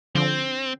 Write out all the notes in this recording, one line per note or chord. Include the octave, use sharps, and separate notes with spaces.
D3 F3 C4